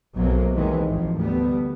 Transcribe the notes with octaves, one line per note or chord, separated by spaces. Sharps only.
B1 C3 F#3 A#3
D#2 C3 D#3 E3 G#3
G#1 F3
D2 G3 B3